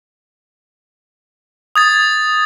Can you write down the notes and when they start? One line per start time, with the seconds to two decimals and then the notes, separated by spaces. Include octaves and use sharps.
1.76 D#6 G#6 A6